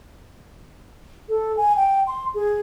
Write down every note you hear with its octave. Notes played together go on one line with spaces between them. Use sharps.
A4
G#5
G5
C6
G#4